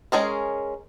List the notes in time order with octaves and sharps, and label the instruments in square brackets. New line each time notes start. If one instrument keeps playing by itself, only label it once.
[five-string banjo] G#3 C#4 G#4 A#4